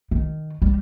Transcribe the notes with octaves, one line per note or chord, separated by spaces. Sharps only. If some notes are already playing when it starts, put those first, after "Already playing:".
D#3
G3